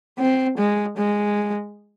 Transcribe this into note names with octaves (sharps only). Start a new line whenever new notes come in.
C4
G#3
G#3